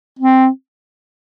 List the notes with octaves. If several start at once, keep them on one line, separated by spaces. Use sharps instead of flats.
C4